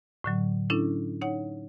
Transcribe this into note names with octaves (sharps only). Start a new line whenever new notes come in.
A2 D3 F#3
C#4 D4 E4 A4
D#4 C#5 F#5